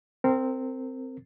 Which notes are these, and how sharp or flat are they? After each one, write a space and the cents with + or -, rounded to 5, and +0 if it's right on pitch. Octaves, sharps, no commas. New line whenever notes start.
C4 -5 A#4 -30